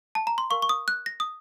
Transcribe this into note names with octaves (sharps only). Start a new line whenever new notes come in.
A5
A#5
C6
A#4 F5 C#6
C#6
D#6
F#6
A#6
D#6